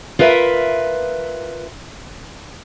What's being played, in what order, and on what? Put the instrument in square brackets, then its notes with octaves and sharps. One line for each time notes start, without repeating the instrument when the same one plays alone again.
[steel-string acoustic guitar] F4 A#4 B4 E5